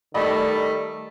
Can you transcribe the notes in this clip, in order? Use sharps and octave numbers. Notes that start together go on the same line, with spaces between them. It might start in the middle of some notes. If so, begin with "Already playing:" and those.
D#3 G3 A3 D5 D#5 B5